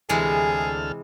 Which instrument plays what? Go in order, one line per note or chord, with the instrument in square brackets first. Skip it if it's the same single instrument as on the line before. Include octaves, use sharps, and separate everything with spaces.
[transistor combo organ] D2 A4 F6 [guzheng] C3 E3 G#3 [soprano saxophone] G#4